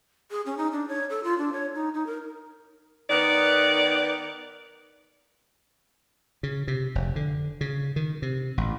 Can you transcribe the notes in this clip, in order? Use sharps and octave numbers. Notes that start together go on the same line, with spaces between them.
G#4
C#4
D#4
D4
C#5
A4
F4
D4
C#5
D#4
D#4
A#4
D#3 B3 A#4 D5
C#3
C3
F1
D3
C#3
D#3
C3
A1